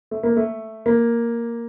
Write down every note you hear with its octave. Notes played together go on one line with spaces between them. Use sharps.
A3
A#3
A3
A#3